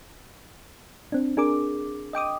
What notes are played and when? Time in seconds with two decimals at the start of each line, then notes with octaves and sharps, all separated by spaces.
1.12 C4 D4
1.37 D4 G#4 A#4 D6
2.13 D#5 G5 D6 D#6